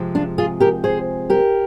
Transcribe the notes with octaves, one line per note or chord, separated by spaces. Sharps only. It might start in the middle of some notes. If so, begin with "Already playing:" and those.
Already playing: C3 F3 G#3
D4 F4
F4 G#4
G4 A#4
G#4 C5
G4 A#4